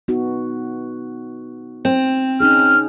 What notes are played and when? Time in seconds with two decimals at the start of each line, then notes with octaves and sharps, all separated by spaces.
0.08 B3 D#4 F#4
1.85 C4
2.40 C#4 D#4 G#4 F6